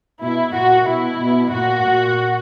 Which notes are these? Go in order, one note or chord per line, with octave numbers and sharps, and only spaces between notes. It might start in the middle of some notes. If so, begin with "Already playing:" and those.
B2 E4
A#2 F#4
B2 E4
B2
A#2 F#4
A#2